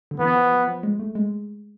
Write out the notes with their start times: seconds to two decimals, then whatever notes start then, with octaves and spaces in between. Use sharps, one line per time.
0.11 D3
0.19 E3 B3
0.35 F3
0.51 F3
0.68 F3
0.83 G#3
0.99 A3
1.15 G#3